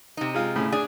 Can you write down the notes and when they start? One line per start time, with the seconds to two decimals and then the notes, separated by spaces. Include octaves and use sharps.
0.17 C3 D#4
0.34 G#3 F4
0.56 A2 C#3
0.72 D4 G#4